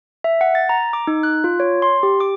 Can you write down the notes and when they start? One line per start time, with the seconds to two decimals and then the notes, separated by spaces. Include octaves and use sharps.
0.24 E5
0.41 F#5
0.55 A6
0.69 A#5
0.93 D6
1.07 D#4
1.23 F#6
1.44 F4
1.60 C#5
1.82 C6
2.03 G4
2.20 D6